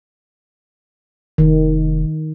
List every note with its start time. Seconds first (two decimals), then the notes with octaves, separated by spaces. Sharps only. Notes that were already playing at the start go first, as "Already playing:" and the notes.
1.38 F1 D#3